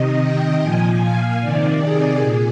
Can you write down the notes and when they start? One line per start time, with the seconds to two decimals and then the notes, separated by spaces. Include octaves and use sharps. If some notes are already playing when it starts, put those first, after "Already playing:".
Already playing: C3 D#3 D#5
0.21 G5
0.61 A#2 F3 G#5
1.01 F5
1.41 C3 D#3 D5
1.81 G#4
2.20 A#2 G#4